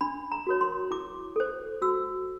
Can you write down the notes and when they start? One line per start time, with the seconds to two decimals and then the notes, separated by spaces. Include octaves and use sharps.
0.01 D4 B5
0.32 A#5
0.47 F#4 A#4 C#5
0.61 C6
0.91 E4 D6
1.36 A4 C5
1.82 F#4 E6